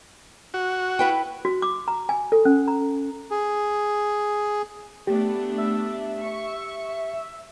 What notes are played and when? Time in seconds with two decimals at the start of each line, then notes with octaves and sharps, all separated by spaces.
0.54 F#4
0.99 E4 B4 G5
1.45 F#4
1.62 D6
1.88 A#5
2.09 G#5
2.32 A4
2.45 C#4
2.68 A#5
3.31 G#4
5.07 A3 B3 D4 G4
5.58 E5
6.22 C#6